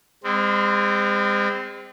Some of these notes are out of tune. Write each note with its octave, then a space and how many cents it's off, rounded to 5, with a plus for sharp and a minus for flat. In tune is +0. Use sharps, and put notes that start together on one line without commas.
G#3 -40 C4 -20